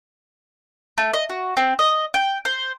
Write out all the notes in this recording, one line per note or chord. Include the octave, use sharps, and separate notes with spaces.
A3
D#5
F#4
C4
D#5
G5
C5